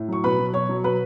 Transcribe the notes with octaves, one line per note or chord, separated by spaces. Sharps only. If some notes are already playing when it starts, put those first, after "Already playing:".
Already playing: A2
F#3 C#6
B2 B4 B5
F#3
B2 C#5 C#6
F#3
B2 B4 B5